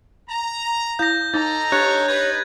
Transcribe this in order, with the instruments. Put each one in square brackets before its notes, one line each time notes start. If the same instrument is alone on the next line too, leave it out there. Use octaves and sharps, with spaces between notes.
[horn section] A#5
[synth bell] E4 F5 [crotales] G6 A#6
[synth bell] D#4 [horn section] A4 D#5 A#5 [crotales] A6
[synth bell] D4 G4 [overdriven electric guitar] C#5 [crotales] F#6 A6
[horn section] D#4 B4 [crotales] G#6